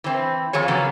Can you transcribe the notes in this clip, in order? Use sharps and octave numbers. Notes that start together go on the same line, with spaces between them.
E3 C4
F2 F3 G#4 C#5
C#3 F#3 A#3 B3